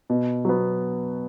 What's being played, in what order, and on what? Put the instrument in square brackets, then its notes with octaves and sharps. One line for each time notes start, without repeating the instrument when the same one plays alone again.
[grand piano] B2
F#3 B3